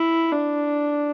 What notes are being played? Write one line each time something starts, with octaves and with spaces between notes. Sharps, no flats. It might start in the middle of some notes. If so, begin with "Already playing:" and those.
Already playing: E4
D4